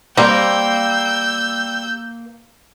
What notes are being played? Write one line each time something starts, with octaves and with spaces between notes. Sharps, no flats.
G3 A#3 C4 E6 G6